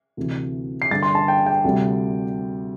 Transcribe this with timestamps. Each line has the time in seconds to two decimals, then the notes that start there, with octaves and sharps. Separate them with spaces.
0.17 D2 C3 E3
0.82 C7
0.91 G2 D3 G3 A6
1.03 C6
1.15 A5
1.28 G5
1.46 G5
1.64 D2 C3 G3